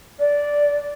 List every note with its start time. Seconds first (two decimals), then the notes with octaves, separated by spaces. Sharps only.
0.19 D5